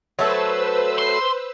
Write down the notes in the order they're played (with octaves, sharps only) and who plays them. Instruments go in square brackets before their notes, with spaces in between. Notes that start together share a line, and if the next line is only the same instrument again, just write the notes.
[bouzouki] F#3 A3 A4 [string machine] B4 C5 E6
[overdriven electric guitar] C6